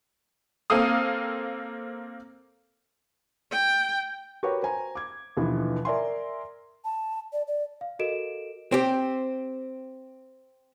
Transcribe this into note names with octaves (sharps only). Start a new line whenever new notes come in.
A#3 C4 A4 F5 D#6
G5
F#4 G4 A#4 B4 C#5
C5 G#5 A#5
D6 G#6
D#2 B2 D3 E3 F3
A#4 D5 E5 G#5 C6
A5
D5
D5
F5
F#4 A4 A#4 D#5 D7 E7
C4 G4